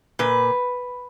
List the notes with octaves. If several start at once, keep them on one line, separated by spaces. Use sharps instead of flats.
A#2 B4